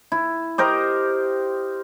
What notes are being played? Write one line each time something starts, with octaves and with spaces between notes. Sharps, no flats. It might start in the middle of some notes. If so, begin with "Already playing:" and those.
E4
G4 A#4 C5 D#5